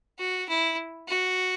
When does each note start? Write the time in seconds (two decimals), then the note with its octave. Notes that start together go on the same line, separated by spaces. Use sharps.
0.19 F#4
0.49 E4
1.09 F#4